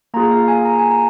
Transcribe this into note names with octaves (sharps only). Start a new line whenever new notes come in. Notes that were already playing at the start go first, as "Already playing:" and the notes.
A#3 F4 G#4 A#5
F5
G#5
A#5
G#5
A#5